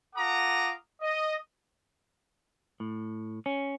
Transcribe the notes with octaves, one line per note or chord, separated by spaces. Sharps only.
F4 A4 F#5 A#5 D6 D#6
D#5
A2
C#4